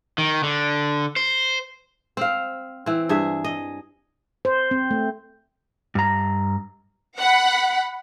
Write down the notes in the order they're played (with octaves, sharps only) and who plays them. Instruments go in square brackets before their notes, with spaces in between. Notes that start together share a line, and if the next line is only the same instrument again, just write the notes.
[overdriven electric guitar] D#3
D3
C5
[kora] C4 F5
E3 C4
G2 G#4 E5
D#5
[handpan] C5
C4
A3
[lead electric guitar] G2 A#5
[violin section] F#5 B5